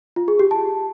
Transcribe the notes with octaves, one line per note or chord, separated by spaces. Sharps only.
F4
G#4
G4
A5